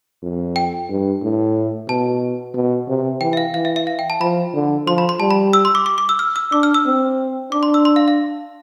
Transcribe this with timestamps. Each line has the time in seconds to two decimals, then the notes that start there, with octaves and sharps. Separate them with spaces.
0.23 F2
0.56 G5
0.89 G2
1.23 A2
1.89 B2 A5
2.55 B2
2.88 C3
3.21 E3 G5
3.33 E5
3.37 F5
3.54 E3 F5
3.65 E5
3.76 E5
3.87 F5
3.99 G5
4.10 A5
4.21 F3 B5
4.54 D3
4.87 F3 C6
4.98 B5
5.09 C6
5.20 G3 A5
5.31 B5
5.53 E6
5.65 C6
5.75 D6
5.86 D6
5.98 D6
6.09 E6
6.19 F6
6.36 E6
6.52 D4 D6
6.63 F6
6.74 E6
6.86 C4
7.52 D4 D6
7.63 C6
7.74 E6
7.85 C6
7.96 F5
8.08 F5